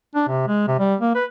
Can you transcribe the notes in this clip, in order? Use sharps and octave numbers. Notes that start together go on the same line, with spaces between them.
D4
C3
G#3
C3
G3
A#3
B4